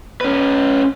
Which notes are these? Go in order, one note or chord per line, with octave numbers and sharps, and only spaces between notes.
C#4 B4